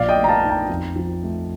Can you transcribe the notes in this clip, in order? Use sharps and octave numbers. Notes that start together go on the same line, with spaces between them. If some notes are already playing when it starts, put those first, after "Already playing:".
Already playing: A#1 D5 F5
D#5 G5
A3
A#5
F5 A5
D#4
G5 A#5
F2
F3
A3